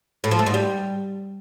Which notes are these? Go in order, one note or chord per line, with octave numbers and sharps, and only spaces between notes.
A2
F3
A3
G#2
G3